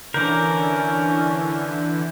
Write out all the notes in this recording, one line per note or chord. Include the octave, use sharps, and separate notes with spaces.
D3 E3 C#4 A#4 D5 G6